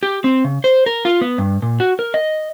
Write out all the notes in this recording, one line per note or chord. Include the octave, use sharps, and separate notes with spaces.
G4
C4
C#3
C5
A#4
F4
B3
G2
A#2
F#4
A#4
D#5